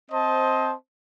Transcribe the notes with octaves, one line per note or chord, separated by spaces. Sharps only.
C4 C5 D#5 A5